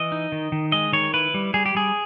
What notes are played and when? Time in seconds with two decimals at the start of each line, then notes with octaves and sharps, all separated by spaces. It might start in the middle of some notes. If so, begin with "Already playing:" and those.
Already playing: E3 D#5
0.12 D#4
0.32 D#3
0.52 D#3
0.72 G#3 D#5
0.93 D#3 C#5
1.14 E4 B4
1.34 G3
1.54 G3 G#4
1.66 G4
1.75 G3 G#4